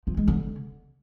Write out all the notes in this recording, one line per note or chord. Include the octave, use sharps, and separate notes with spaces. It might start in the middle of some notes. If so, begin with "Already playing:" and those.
F3
G#3
D3